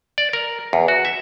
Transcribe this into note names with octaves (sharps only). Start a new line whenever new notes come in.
D5
A#4
E2
F#4
E5